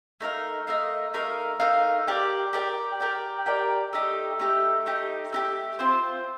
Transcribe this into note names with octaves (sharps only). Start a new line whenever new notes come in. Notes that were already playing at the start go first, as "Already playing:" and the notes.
A3 D#4 A#4 F5
A3 D#4 A#4 F5
A3 D#4 A#4 F5
A3 D#4 A#4 F5
G4 A#4 D5 G5
G4 A#4 D5 G5
G4 A#4 D5 G5
G4 A#4 D5 G5
A3 D#4 G4
A3 D#4 G4
A3 D#4 G4
A3 D#4 G4
C4 F4 C5